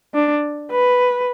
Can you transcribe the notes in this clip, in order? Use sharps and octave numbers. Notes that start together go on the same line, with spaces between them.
D4
B4